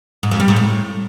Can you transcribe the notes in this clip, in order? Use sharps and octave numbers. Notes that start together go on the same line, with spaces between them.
G#2
F2
G3
G#2
A2